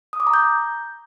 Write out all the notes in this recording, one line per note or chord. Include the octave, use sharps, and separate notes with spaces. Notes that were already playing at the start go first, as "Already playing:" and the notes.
D#6
D6
A#5
G6